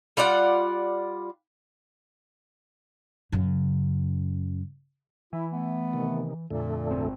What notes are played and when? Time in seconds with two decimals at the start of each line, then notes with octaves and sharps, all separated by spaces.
0.17 G3 F4 D5 F#5
3.32 F#2 C#3
5.33 E3 E4
5.51 A3 B3
5.93 C3 D#3
6.51 F2 A#2 D3 A3
6.91 G#1 C4